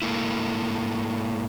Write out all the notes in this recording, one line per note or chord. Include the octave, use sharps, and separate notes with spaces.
G#2 A3 A#3 E4